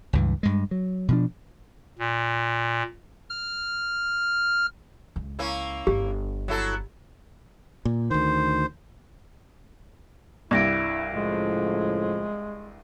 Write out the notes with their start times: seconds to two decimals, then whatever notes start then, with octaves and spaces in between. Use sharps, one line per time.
0.13 C#2 G2 E3
0.43 G2 G#3
0.71 F#3
1.08 B2 F3 D4
1.99 A#2
3.30 F6
5.16 C#2
5.39 A#3 C#4 E4
5.87 G1 G4
6.48 F#3 E4 A4
7.85 A#2
8.11 D2 D#3 C5
10.51 C2 G2 E4 D5 G#6 A#6 D7
11.14 A2 C#3 F3 G#3